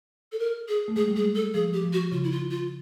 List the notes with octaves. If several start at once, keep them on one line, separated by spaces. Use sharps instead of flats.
A4
A#4
G#4
A3
G#3 G#4
G3
G#3 G#4
A4
F3 G#4
G4
F3
F#4
C#3 F4
E4
F4
F4